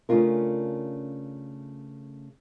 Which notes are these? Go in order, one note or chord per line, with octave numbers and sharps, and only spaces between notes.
C#3 A3 C#4 D4 F4 A#4